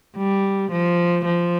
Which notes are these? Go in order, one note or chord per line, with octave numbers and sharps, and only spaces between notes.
G3
F3
F3